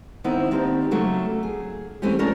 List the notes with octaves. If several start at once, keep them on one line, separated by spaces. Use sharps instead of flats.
D#3 B3 C4 E4 A#4 C5
D#3 A#3 C4 D4 G4 B4
C#3 F#3 A3 A#3 C#4
G#4
E3 G#3 A3 C4 C#4 G4
F3 C#4 D4 A#4 C#5